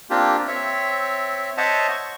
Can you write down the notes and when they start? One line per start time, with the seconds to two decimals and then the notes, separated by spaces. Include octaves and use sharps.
0.10 A#3 C4 D4 F4 G4
0.47 C4 C#5 E5
1.57 C5 C#5 D#5 E5 F#5 A5
1.91 C#6